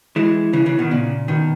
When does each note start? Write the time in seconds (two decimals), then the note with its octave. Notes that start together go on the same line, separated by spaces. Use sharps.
0.16 E3 G#3
0.53 C#3 E3
0.66 C#3 E3
0.79 B2 D#3
0.91 A#2 C#3
1.28 B2 D#3